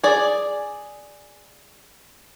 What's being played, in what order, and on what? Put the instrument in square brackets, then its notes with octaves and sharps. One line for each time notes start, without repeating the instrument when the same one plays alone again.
[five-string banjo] G#4 D5